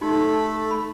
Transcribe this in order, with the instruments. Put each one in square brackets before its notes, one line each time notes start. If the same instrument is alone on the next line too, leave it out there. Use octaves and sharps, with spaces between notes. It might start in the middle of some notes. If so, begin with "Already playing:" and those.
[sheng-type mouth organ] A3 A4 B5 [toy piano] D#4 F#4 G4
[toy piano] B5